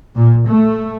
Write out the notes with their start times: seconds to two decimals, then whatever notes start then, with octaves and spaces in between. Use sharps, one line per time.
0.16 A#2
0.45 A3